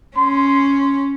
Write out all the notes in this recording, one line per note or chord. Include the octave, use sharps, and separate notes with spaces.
C#4 C6